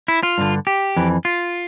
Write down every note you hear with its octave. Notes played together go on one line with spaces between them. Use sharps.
E4
F4
G2 D3
G4
F2 E3
F4